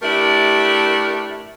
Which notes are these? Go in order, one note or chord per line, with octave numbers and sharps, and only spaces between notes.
A3 D4 E4 G4 A#4